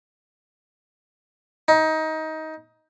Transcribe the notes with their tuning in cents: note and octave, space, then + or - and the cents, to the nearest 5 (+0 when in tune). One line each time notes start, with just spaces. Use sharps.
D#4 +20